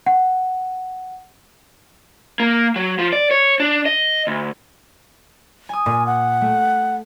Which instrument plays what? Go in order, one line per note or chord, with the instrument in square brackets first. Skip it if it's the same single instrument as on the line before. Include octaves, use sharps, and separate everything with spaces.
[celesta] F#5
[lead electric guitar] A#3
F#3
F3
D5
C#5
D4
D#5
D2
[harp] G#5 D#6
[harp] A#2 [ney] G#5
[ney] F#5
[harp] A3